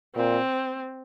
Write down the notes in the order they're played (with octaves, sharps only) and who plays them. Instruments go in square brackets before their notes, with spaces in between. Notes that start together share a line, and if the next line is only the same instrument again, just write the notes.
[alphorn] A#2 [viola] C4